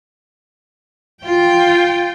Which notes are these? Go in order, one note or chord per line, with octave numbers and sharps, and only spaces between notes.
F4 G5